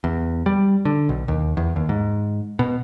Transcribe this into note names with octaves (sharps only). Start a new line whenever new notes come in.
E2
G3
D3
B1
D#2
E2
D#2
G#2
B2